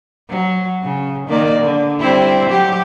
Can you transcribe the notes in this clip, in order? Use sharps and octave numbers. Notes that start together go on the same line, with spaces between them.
F#3
C#3
D#3 A#3 D5
D3
G3 C4 E4
F#3 G4